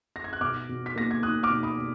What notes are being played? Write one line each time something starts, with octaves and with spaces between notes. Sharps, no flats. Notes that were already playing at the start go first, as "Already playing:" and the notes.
A#6
G#6
F#6
B2 D6 F6
B2
B6
A#3 A#6
G#6
D#4 D#6 F#6
D6 F6
B2
B5 D#6
B2